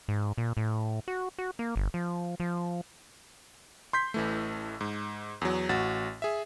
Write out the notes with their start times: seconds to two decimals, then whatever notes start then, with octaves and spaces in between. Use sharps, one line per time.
0.08 G#2
0.38 A#2
0.57 A2
1.08 F#4
1.39 F#4
1.59 A#3
1.76 G1
1.94 F3
2.40 F3
3.93 C6 G6 B6
4.14 A1 E3 A3
4.81 G#2
5.41 E2 F#3
5.69 A1 F#4 A6
6.22 G#4 E5